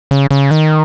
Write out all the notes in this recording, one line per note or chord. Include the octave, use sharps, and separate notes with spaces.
C#3
C#3
D#3